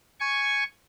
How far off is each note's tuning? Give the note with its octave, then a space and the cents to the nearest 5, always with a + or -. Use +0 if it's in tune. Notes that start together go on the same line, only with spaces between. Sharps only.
G#5 +0 C#6 +0